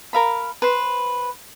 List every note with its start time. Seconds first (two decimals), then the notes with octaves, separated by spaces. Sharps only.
0.13 A#4 F5 B5
0.62 B4 C5